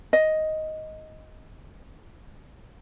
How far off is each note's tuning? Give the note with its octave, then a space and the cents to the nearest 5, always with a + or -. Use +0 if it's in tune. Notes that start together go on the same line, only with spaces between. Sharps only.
D#5 +5